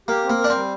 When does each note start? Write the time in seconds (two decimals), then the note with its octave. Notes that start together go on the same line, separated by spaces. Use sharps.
0.08 A#3 G4
0.24 C4
0.30 A#3
0.39 A#4
0.44 D4
0.50 C4
0.55 G3